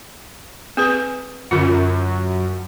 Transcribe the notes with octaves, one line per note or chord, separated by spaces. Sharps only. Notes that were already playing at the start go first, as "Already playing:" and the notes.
C4 G#4 B4
F#2 D3 F4